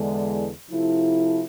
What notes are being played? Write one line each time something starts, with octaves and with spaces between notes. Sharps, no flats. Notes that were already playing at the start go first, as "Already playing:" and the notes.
Already playing: E2 D3 G#3
C3 F3 A3 E4